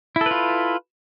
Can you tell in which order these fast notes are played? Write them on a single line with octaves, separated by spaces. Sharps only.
E4 A4 B4 F4